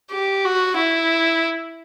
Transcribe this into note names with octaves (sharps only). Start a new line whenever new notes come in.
G4
F#4
E4